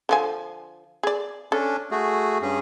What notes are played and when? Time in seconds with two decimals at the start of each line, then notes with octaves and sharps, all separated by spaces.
0.09 D3 F3 G#5
1.03 G#4 D5
1.52 C#4 D4 A4
1.91 A3 F#4 G#4
2.42 G2 C#4 G#4